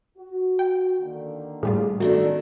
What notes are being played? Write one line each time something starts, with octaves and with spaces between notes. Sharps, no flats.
F#4
G5
D3 D#3 A#3
A2 G3 F4 G#4
D#3 A3 B3 D4 F#4 A4